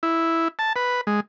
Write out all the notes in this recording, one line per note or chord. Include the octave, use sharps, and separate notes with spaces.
E4
A5
B4
G#3